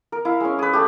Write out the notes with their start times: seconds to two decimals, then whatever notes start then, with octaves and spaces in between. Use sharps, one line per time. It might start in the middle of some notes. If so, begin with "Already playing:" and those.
0.12 A#4
0.25 E4 F5
0.40 G#3 C#4
0.59 G#4 B4
0.73 A3 G4